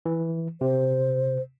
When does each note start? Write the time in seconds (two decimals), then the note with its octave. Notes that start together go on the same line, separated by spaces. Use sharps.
0.06 E3
0.61 C3 C5